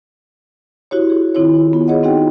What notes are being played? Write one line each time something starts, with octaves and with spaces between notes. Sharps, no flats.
E4 F#4 G4 C#5
G#4
D#3 C4 E4 F4 C#5
B3 F4
G#4 C#5 D#5 F#5
C4 D#4 F#4 G#4 F#5 G5